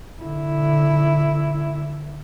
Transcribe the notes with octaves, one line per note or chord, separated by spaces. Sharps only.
D3 E4